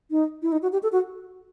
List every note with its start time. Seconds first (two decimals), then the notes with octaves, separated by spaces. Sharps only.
0.11 D#4
0.42 E4
0.52 D#4
0.62 F#4
0.72 G4
0.83 A4
0.92 F#4